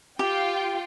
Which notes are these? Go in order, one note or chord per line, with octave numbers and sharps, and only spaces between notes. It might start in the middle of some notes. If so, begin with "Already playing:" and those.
F4 G4 G5